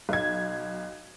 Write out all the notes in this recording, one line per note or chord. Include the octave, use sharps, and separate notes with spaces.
B1 G#6